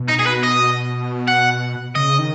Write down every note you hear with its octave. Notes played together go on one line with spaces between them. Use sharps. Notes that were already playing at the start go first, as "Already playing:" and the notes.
Already playing: B2
D#4
G#4
B4
D#5
F#5
C#3 D#5
D#3